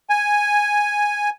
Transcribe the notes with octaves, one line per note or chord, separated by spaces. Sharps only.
G#5